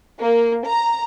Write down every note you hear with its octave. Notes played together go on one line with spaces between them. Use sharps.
A#3
A#5